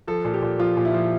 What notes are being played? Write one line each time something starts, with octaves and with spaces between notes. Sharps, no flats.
F3 A4
A#2
G4
A#2
F3 F4
A#2
E4
F3